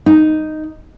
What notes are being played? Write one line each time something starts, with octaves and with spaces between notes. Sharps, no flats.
D#4